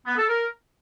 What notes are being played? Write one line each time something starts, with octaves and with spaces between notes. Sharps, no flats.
B3
A4
A#4